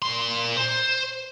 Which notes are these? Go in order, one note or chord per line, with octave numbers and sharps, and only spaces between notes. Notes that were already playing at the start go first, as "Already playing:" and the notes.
A#2 C6
C5